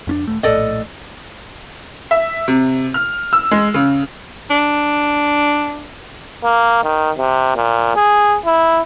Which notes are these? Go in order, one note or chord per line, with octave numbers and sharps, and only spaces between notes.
F2 C#4 D4
D#1 A3
A#1 A2 A4 D5 D#5
E5
C3
F6
E6
G#3
C#3
D4
A#3
D#3
C3
A#2
G#4
E4